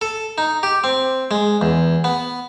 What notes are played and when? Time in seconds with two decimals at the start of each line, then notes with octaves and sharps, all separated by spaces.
0.01 A4
0.38 D#4
0.63 G4
0.84 C4
1.31 G#3
1.61 E2
2.04 B3